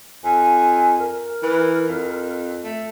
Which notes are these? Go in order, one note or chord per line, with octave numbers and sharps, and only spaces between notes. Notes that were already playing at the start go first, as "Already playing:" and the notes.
F2 G#5
A#4
E3
F2
A3